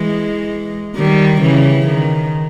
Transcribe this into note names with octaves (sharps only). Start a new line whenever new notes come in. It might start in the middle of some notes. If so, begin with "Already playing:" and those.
Already playing: E3 G#3
D#3 G3
C#3 E3
D#3